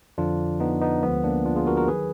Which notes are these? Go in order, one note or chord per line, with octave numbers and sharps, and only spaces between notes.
F2 D3 F3 D4 F4
B3 D#4
B3 D#4
D2 D3 F3 G#3 B3
A#3 D4
D4 F4
F4 G#4
F#4 A#4
F#4 A#4
D#3 F#3 G#4 B4